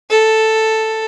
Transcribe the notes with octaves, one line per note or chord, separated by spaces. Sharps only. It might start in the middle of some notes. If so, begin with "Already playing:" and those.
A4